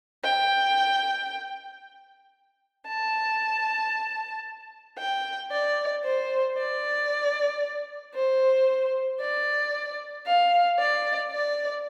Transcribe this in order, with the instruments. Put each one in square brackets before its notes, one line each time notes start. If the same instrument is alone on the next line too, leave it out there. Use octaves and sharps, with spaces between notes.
[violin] G5
A5
G5
D5
C5
D5
C5
D5
F5
D5
D5